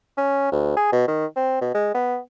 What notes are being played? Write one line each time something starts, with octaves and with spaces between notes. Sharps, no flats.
C#4
D2
G#4
B2
D#3
C4
B2
G#3
B3